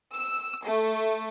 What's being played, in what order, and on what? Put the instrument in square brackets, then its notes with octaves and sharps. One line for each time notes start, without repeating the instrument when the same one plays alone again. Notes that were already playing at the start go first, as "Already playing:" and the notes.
[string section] E6
A3